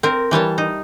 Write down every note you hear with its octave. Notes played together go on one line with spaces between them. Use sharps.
C4 A#4
E3 G3 C#5 A5
D#4